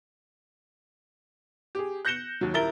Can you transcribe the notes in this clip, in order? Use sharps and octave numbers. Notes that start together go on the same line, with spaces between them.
G4 G#4
F#6 G6 A#6 C#7 E7 G7
D#2 F#3
D#1 E4 A#4 A#5 A6 G7